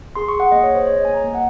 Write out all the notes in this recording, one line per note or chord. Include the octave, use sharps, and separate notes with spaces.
G#4 C6
C#6
G#4
F#5
A#3 D#5
C#5
G#4 C5
G#4 C#5
D#5
A#3 G#5
A#5
A#3
F#5